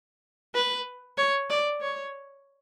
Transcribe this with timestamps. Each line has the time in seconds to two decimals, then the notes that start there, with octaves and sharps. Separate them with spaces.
0.55 B4
1.17 C#5
1.50 D5
1.81 C#5